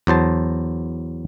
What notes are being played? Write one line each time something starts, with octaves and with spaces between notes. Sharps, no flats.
E2 F#3 C5 A5